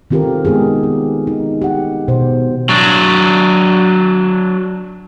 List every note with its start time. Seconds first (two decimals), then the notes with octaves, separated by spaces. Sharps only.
0.11 D#3 C4 F4 G4 A4 A#4
0.45 G#3 B3 D#4 G4 G#4
0.83 D#4
1.27 D#4
1.62 G4 F#5
2.08 B2 C5
2.69 F#3 D4